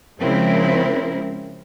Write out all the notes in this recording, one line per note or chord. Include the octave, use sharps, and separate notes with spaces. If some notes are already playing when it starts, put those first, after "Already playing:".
C#3 F3 G#3 C4 E4 A#4